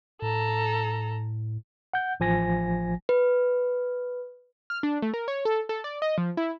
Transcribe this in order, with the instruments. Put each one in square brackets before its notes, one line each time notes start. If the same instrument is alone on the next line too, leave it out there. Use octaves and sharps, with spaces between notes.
[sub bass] A2 [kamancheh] A4 A#5
[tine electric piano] F#5 G6
A1 F3 G#5 A#6
[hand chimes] B4
[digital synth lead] F6
D4
A3
A#4
C#5
A4
A4
D5
D#5
F3
E4